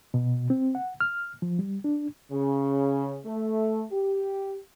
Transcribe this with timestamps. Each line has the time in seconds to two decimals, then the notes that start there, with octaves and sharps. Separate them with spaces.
0.14 B2
0.50 C4
0.75 F#5
1.00 F6
1.42 F3
1.59 G3
1.84 D4
2.31 C#3
3.25 A3
3.91 G4